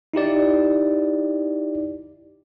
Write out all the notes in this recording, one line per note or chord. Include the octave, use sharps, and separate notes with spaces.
D#4 E4 G4 D5